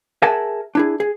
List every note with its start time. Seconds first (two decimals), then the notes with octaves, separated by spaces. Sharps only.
0.22 G#4 A#4 E5 F#5 G#5 A5
0.75 D4 E4 G#4
1.00 G#4